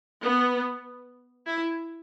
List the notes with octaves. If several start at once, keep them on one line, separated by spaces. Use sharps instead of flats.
B3
E4